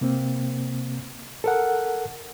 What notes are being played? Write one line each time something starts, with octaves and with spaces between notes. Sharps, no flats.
C3 A#3 C4
A4 A#4 F#5